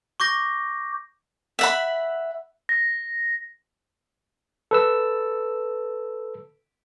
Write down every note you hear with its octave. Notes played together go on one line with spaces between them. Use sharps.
C#6 D6 G6 A#6
E5 F#5 B5
A#6
A4 B4 E6